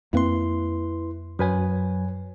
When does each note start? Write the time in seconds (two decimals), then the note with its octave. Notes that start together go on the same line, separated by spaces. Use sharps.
0.13 F2 A#3 C4 E4 B4 C6
1.39 F#2 F#3 B4 C#5 G#5